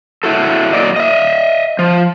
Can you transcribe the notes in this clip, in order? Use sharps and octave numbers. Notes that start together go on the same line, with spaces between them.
E4 F#4 A4
F#3 A#3 D5 D#5
D#5 E5
F3